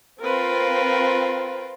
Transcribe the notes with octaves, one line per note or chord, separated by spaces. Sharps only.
C4 F4 A#4 B4